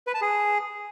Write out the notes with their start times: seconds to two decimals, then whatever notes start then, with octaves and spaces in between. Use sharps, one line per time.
0.07 B4
0.14 A5
0.21 G#4